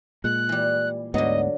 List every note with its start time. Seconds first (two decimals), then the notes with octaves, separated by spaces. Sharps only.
0.24 A#2 G#3 F#6
0.49 E3 G3
1.14 D2 G#2 D3 F#3 B3 D#5